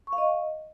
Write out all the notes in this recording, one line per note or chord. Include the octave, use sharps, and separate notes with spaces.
C#6
F5
D#5